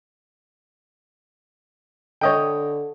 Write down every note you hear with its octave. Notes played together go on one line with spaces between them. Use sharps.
D3 C#5 D#5 G5